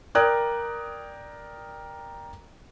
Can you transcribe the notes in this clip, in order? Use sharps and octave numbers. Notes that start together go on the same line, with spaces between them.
A#4 D5 G5 D#6 F#6 G#6